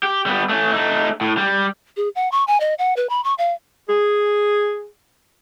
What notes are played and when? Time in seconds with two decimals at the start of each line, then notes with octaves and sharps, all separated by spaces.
0.03 G4
0.26 G3 B3
0.49 A3 C#4
0.73 A3 D#4
1.21 A2
1.37 G3
1.97 G#4
2.15 F#5
2.32 C#6
2.47 G#5
2.60 D#5
2.78 F#5
2.96 B4
3.09 B5
3.24 C#6
3.38 F5
3.88 G#4